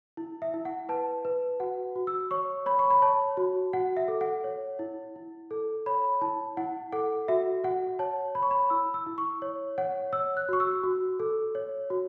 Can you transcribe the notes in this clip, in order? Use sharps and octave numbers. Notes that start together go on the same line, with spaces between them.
E4
E5
E4
F#5
B4 A5
B4
F#4 F#5
F#4
E6
C#5 C#6
C#5 B5
C#6
B5
C#5 A5
F#4
F#4 F#5
E5
A4
F#5
C#5
E4
E4
A4
C#5 B5
E4 A5
E4 F#5
A4 F#5
F#4 E5
F#4 F#5
C#5 A5
C#5 B5
C#6
B5
E4 E6
E6
E4
C#6
C#5
C#5 F#5
C#5 E6
F#6
F#4 C#6
E6
F#4
A4
C#5
F#4